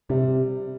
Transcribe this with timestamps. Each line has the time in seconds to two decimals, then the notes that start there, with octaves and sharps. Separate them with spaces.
0.09 C3 G3